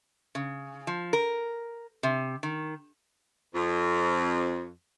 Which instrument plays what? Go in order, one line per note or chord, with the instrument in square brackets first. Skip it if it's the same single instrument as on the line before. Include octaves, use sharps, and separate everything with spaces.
[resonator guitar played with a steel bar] C#3
F3
A#4
C3
D#3
[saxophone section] F2